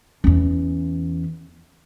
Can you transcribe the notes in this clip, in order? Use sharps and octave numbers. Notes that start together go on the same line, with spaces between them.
E2 C#4